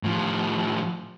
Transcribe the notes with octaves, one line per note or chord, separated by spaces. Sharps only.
A2 F3